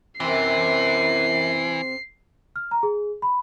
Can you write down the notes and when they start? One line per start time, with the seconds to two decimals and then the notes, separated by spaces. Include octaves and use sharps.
0.20 F#2 C3 E3 C4 C7
2.56 F6
2.71 A#5
2.83 G#4
3.22 B5